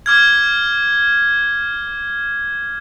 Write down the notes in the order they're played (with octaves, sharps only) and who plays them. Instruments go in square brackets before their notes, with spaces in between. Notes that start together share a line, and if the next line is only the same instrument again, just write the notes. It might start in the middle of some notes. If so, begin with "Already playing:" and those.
[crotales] D6 F6 G#6